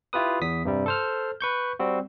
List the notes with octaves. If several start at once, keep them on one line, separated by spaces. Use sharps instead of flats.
E4 F4 G4 B4 D#6
E2 D#6 B6
G2 C3 G3
A4 C5 F6
B4 C#6 G6
G3 C4 F#4